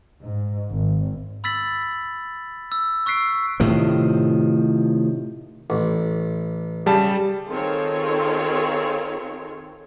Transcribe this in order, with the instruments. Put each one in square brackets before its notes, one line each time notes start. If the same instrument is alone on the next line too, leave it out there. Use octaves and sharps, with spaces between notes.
[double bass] G#2
G#1
[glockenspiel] B5 E6 A6 B6 F#7
E6
C#6 E6 F#6 B6 C7 D7
[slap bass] A2 C3 D#3 F3
[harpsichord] A1
[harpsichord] C#3 [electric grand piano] G3 A5
[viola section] D#3 C4 F4 G#4 A4 C#5